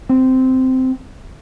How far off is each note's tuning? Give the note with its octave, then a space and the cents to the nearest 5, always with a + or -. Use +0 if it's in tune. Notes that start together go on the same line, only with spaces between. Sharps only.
C4 -10